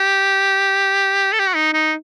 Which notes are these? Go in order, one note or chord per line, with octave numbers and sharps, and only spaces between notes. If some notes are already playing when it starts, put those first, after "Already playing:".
Already playing: G4
A4
G4
F#4
D#4
D#4